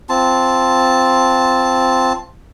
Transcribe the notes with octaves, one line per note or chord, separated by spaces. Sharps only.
C4 F4 A5